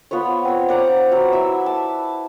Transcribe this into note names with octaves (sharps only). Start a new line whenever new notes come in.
B3 F4 B4 C#5
C4 C#5
D5 F#5 A#5
F#3 B4
E4 E5 E6
A5